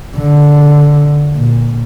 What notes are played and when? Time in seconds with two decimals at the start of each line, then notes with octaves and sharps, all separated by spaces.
0.17 D3
1.36 A#2